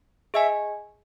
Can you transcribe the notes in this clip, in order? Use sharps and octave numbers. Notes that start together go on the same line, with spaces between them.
G#4 D#5 E5 G#5